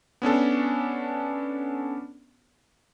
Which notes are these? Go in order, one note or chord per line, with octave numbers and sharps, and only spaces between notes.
B3 C#4 D4 A4